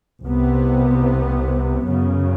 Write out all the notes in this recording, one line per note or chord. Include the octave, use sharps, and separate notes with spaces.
C2 C3 B3
F#2 C#3